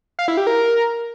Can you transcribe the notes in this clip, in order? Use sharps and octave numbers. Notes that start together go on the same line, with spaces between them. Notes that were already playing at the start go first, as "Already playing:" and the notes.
F5
E4
G4
A#4